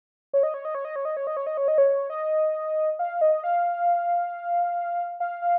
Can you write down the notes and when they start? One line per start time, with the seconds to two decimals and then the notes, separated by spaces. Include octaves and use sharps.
0.33 C#5
0.43 D#5
0.54 C#5
0.65 D#5
0.75 C#5
0.85 D#5
0.96 C#5
1.05 D#5
1.17 C#5
1.27 D#5
1.37 C#5
1.47 D#5
1.57 C#5
1.68 D#5
1.78 C#5
2.10 D#5
2.99 F5
3.21 D#5
3.44 F5
5.20 F5
5.42 F5